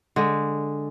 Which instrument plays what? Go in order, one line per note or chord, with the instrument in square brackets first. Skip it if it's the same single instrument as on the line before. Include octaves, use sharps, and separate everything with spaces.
[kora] D3 G#3